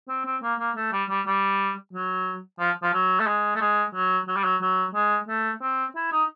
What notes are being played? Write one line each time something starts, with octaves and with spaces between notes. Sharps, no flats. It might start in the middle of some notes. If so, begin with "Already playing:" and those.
C4
C4
A#3
A#3
A3
G3
G3
G3
F#3
F3
F3
F#3
A3
G#3
A3
G#3
F#3
F#3
G3
F#3
F#3
G#3
A3
C4
E4
D#4